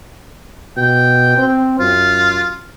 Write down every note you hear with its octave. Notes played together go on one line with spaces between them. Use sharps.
B2 G5
C4
F#2 F4